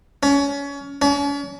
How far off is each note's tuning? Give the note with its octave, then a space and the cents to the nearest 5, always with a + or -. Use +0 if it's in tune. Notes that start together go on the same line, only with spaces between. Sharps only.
C#4 +25
C#4 +40